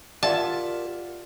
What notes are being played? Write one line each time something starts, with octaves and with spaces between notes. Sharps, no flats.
F4 G4 A#4 D5 E5 F#5 A5